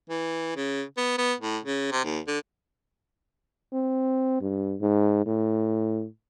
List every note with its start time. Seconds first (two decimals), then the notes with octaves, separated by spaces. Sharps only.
0.09 E3
0.56 C#3
0.97 B3
1.18 B3
1.41 A2
1.64 C#3
1.92 C3
2.04 D#2
2.27 D3
3.73 C4
4.41 G2
4.81 G#2
5.26 A2